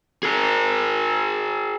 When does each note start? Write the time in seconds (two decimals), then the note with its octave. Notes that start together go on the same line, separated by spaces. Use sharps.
0.23 G#4 A#4